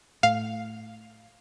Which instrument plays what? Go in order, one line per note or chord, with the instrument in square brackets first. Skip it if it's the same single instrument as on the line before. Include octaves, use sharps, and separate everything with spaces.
[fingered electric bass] A2 [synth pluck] F5